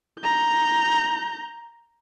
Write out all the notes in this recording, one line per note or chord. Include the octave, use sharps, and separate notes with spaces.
A#5 G6